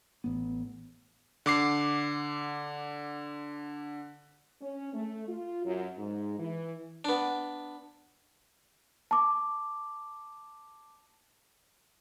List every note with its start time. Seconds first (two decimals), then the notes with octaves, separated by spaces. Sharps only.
0.24 A1 B3
1.46 D3 D6 C7
4.62 C#4
4.94 A3
5.28 F4
5.65 F#2
5.98 G#2
6.39 E3
7.05 B3 D4
9.11 A5 D6